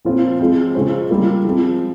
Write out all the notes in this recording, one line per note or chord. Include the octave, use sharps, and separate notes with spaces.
A#2 F3 C4 F4 C5
F3 G#3 C4
C#3 G#3 C#4 F4 C5
G3 A#3 F4
F3 G#3 C4